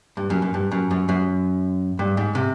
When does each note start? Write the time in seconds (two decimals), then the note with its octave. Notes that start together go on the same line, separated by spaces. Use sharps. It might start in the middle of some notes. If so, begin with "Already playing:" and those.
0.17 G2
0.30 F#2
0.42 F#2
0.54 G2
0.71 F#2
0.91 F#2
1.09 F#2
1.99 G2
2.17 G#2
2.35 C3